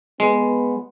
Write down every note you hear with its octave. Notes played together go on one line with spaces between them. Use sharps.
G#3 B3